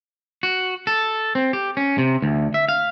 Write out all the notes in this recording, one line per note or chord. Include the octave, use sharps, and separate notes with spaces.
F#4
A4
C4
G4
C#4
C3
D2
E5
F5